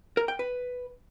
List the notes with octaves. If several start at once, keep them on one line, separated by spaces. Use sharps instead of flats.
A#4
G5
B4